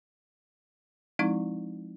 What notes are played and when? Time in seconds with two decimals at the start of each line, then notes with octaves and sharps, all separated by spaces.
1.19 F3 G#3 C4 D#4 E4